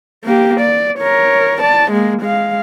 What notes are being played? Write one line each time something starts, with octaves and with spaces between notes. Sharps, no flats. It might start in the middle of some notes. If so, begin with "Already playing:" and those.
A#3 G4
D5
A#4 C#5
D5 A5
G#3 A#3
G#3 F5